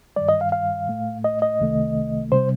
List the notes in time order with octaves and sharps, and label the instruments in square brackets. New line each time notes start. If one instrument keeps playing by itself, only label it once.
[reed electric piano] G2 D#3 G3 D5
D#5
F5
F5
A2 A3
D#5
D#5
C2 C3 D#3 A3
C3 G3 C5